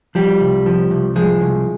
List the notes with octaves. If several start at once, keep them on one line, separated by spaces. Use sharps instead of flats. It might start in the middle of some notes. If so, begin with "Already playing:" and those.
F3 G3 G4
C2
F3
C2
F3 G#3 G#4
C2